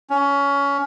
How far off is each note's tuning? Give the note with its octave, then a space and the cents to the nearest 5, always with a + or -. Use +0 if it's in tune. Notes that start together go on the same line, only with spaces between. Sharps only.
C#4 +20